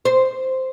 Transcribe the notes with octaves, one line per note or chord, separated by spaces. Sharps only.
C5